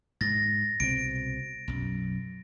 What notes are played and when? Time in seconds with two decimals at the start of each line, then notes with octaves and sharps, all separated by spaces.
0.21 G#2 A6 A#6
0.80 C2 B2 C4 D7
1.68 B1 F#2